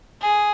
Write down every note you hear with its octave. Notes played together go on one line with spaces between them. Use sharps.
G#4